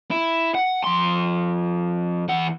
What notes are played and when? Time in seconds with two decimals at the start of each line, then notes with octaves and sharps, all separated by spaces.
0.11 E4
0.55 F#5
0.84 F2 C6
2.28 E2 F#5